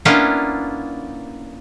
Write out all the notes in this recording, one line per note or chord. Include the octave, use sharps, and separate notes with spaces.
A#3 B3 C#4 D4 E4 F4